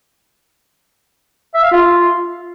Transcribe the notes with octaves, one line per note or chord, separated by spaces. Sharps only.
E5
F5
F4